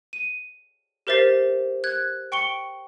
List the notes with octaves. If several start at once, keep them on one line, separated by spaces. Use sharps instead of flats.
D#7
G4 A#4 C5 E5 A6 C7
F#6 G#6
G5 C#6 C#7 G7